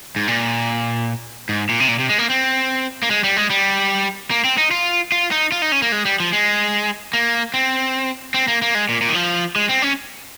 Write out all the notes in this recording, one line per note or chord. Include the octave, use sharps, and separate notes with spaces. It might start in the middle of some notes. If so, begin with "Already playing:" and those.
G#2
A#2
G#2
A#2
C3
A#2
C3
G#3
A#3
C4
A#3
G#3
G3
G#3
G3
A#3
C4
D#4
F4
F4
D#4
F4
D#4
C#4
A#3
G#3
G3
F3
G#3
A#3
C4
C4
A#3
A#3
G#3
A#2
A#2
D#3
F3
G#3
C4
C#4